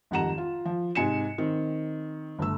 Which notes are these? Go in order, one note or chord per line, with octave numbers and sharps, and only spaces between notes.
G#1 F2 G3 F#5 A#5 E7
F4
F3
G#2 C3 G#5 C#7 E7
D#3 C4
G1 A3 E6